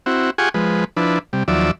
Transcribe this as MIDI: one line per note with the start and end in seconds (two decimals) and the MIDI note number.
0.06 0.30 60
0.06 0.30 64
0.06 0.30 66
0.38 0.49 65
0.38 0.49 67
0.38 0.49 68
0.38 0.49 78
0.38 0.49 80
0.38 0.49 85
0.54 0.84 53
0.54 0.84 56
0.54 0.84 71
0.97 1.19 53
0.97 1.19 62
0.97 1.19 64
0.97 1.19 71
1.33 1.43 48
1.33 1.43 55
1.48 1.71 39
1.48 1.71 53
1.48 1.71 54
1.48 1.71 74
1.48 1.71 76